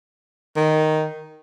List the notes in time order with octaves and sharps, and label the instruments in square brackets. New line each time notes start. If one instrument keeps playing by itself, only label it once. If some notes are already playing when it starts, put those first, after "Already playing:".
[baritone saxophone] D#3